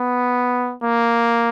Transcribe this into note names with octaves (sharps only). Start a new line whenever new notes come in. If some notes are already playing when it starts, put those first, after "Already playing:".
Already playing: B3
A#3